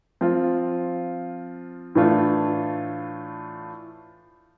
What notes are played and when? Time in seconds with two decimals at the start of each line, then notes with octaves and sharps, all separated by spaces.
0.21 F3 C4 F4
1.95 A2 E3 A3 D4 F4